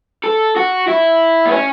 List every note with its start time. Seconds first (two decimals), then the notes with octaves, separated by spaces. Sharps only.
0.24 A4
0.56 F#4
0.88 E4
1.46 B3
1.51 C#4